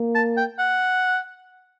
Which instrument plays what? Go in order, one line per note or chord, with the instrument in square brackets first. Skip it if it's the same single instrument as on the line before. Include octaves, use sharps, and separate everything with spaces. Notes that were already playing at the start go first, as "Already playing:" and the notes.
Already playing: [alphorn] A#3
[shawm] A5
G5
F#5